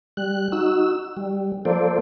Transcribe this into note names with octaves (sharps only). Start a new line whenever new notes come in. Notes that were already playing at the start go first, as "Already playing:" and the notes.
G3 F#6
D#4 F#4 E6
G3
F3 A#3 A4 C5 D5